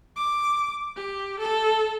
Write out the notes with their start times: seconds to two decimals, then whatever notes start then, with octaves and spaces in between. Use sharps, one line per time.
0.16 D6
0.96 G4
1.39 A4